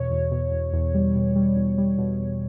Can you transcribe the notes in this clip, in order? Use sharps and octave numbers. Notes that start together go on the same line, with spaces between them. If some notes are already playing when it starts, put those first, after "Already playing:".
Already playing: E2 B2 C#5
E2
B2
E2
E2
G3
B2
G3
E2
G3
B2
E2